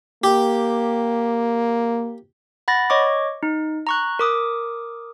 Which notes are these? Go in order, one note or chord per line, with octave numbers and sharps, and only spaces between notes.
A#3 G4
F#5 B5 A6 A#6
C#5 D#5 C#6 D6
D#4
A#5 C#6 F#6
A#4 D6 D#6